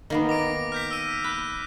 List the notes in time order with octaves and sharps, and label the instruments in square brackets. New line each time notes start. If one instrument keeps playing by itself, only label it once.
[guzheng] D#3 A#3 B3
[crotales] D6 A#6 D7
F6 G6 B6
E6 D#7
[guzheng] B5 [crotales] F#6